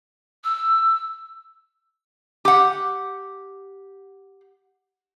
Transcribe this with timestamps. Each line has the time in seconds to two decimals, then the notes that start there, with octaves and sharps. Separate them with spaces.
0.44 E6
2.45 G4 F#5